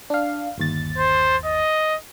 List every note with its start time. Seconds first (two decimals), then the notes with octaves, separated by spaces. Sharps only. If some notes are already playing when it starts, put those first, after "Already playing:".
0.10 D4 F5
0.58 G1 D#2 A6
0.98 C5
1.45 D#5